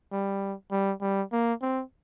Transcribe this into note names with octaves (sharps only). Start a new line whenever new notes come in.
G3
G3
G3
A#3
C4